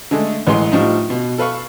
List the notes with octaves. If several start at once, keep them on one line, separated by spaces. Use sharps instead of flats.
D3 G#3 A3
A1 E3 G#3 C6
A2 F3 G3 D4 D#4
B2
A4 B4 F5 C#6